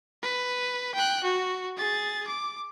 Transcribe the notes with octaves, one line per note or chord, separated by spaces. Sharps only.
B4
G5 F#6
F#4
G#4 A6
D6